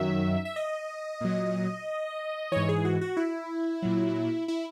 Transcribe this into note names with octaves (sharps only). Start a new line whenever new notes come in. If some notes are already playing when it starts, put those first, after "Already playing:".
Already playing: F#2 D#3 F#3 E5
E5
D#5
A#2 F#3
G#2 E3 C#5
G#4
F#4
F#4
E4
A#2 F#3
E4